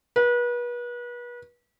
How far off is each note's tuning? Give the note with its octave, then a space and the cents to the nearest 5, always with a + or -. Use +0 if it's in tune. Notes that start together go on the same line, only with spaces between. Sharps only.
B4 -35